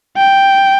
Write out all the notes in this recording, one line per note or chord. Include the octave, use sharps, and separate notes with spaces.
G5